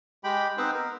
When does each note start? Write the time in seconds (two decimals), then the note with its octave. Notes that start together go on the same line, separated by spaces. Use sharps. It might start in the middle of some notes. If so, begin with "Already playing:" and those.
0.24 G#3 G4 G5 B5
0.57 B3 C4 D#4 B4 C5
0.74 A#4